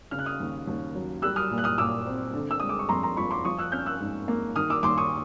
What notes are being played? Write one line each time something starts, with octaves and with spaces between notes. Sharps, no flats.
C#3 F6
F#6
D#6 F6
D#2
D#2
F#3
G3 E6 F#6
D#6 F6
A#2
F#6
D#6 F6
A#2 D6 E6
C4
D3
E6
G#3 D#6
D6
C#6
F2 A#5 C6
A#5 C6
F3 B5 C#6
C6 D6
F3 C#6 D#6
E6 F#6
C#4 F6 G6
E6 F#6
G#2
A#3
D#3 D#6 F6
D6 E6
D#2 C6 D6
C#6 D#6